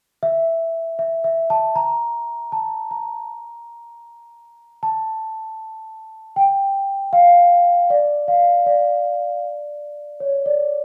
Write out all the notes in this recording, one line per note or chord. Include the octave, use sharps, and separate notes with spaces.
E5
E5
E5
A5
A#5
A5
A#5
A5
G5
F5
D5
F5
D5
C#5
D5